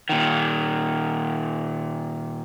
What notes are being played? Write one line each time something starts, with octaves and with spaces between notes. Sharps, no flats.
A#2 D#3